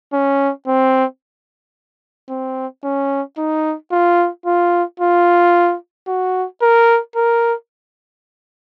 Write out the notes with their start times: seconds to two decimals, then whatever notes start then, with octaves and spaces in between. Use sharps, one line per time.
0.13 C#4
0.67 C4
2.29 C4
2.84 C#4
3.37 D#4
3.91 F4
4.45 F4
5.00 F4
6.07 F#4
6.62 A#4
7.16 A#4